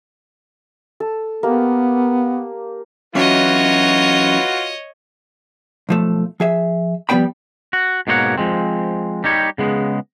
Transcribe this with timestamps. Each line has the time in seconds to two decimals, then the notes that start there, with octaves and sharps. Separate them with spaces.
1.00 A4
1.43 A#3 B3 G4
3.15 E3 F#3 C#4 F4 F#4 B4 C#5 D#5
5.89 B1 F3 A3
6.40 F3 G#4 E5
7.09 F3 G3 B3 C5 G5 B5
7.73 F#4
8.07 G#2 B2 A#3 E4 C#5 F#5
8.38 F3 G#3 C4
9.24 G3 D#4 G4 C#5
9.58 C#3 G#3 B3